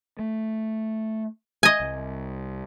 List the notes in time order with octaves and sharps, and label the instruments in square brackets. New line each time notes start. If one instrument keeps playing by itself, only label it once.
[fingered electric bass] A3
[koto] D#5 G#5
[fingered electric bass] C2